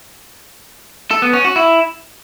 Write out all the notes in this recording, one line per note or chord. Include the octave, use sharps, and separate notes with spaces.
A4
B3
C#4
F#4
E4